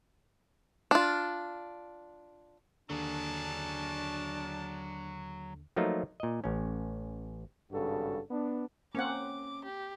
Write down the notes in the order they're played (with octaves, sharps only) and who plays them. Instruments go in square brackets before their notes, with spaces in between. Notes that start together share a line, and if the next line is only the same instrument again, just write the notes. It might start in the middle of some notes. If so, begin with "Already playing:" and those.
[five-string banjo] D4 F4
[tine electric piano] D#2 D3 [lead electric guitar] F#3 G#4 [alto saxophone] D4 [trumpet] A5
[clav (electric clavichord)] F3 F#3 A3 A#3 D#4 F4
A#2 D#5
A1 C#4
[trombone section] G#1 G2 C#3 F#4 A4
B3 D4
[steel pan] A#3 C4 F#5 [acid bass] C#4 [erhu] D6
[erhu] G4